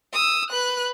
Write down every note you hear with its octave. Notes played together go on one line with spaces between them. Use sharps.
D#6 E6
B4 F#6